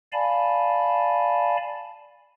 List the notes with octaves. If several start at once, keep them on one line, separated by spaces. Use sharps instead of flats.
D5 F5 G#5 A5 B5